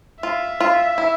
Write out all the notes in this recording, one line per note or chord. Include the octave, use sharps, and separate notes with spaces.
F4 E5
F4
E4